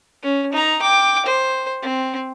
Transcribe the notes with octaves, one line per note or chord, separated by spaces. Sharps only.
C#4
D#4 A#5
G5 D6
C5
C4